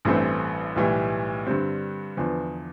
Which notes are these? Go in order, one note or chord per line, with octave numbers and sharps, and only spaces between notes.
A1 G2 E3 A3 C4
B1 A2 E3 G3
G2 D3 G3 C4
E2 D3 F3 B3